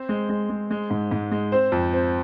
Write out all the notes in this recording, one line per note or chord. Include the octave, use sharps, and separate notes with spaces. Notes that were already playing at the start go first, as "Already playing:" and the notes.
Already playing: C4 C5
G#3
G#3
G#3
G#3
G#2
G#2
G#3
C4 C5
F2
C4